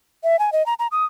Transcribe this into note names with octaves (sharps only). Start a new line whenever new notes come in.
E5
G#5
D#5
A#5
A#5
D#6